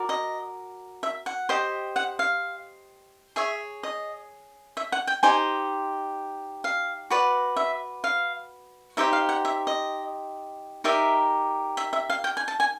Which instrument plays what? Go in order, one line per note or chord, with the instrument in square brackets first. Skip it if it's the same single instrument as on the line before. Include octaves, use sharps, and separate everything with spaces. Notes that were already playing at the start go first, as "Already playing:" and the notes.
Already playing: [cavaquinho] F#4 A#4 D5
D#5
E5
F#5
G4 C5 D#5
F#5
F5
G#4 C#5 E5
D#5
E5
F#5
G5
D#4 G4 C5 G#5
F5
F#4 B4 D5
E5
F5
D#4 G4 C5 E5
F5
F#5
E5
D#5
D#4 G4 A#4 D5 E5
E5
E5
F5
G5
G#5
A5
G#5